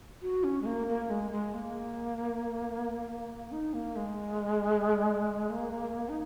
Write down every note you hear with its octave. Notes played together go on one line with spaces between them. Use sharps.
F#4
C#4
G#3
A#3
A#3
G#3
G#3
A#3
D#4
A#3
G#3
A#3
D#4